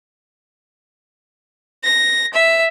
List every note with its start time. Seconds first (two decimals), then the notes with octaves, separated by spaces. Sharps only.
1.84 A#6
2.34 E5